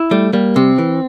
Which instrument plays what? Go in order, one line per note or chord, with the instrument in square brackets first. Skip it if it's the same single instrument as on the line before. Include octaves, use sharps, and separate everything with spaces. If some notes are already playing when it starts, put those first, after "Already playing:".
Already playing: [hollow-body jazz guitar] E4
[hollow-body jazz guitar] G3 [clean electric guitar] A3
[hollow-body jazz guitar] G3 [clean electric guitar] A#3
[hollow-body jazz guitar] C3 [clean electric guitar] C4
[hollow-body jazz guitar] E3